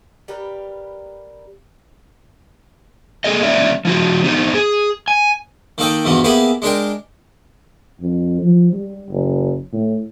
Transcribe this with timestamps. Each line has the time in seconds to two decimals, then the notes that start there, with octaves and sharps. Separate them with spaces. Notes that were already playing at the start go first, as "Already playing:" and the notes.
0.28 G3 G4 A#4 B4
3.24 A#3 G#4 A4 D#5
3.43 G3 A#3 C#4 D5 E5
3.85 F3 E4 F#4
4.24 B3 D#4 G4 C5
4.55 G#4
5.08 G#5
5.78 D#3 A#3 A4 D#5 G5
6.05 E2 G2 B2 E3 F3
6.24 A#3 B3 E4 G4 G#4
6.62 G#3 D4 A#4 G5
8.00 F2
8.42 F3
8.73 G3
9.10 F#1
9.73 A2